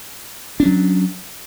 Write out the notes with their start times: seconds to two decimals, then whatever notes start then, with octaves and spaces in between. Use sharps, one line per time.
0.60 D4
0.63 C#4
0.65 F#3